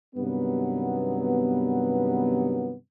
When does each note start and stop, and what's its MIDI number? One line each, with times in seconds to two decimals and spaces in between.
0.15 2.74 43
0.15 2.74 48
0.15 2.74 51
0.15 2.74 54
0.15 2.74 59